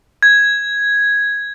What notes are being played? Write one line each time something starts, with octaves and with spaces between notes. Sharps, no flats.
G#6